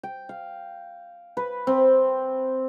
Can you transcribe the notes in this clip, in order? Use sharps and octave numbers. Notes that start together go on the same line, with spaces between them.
G5
F5
B4
C4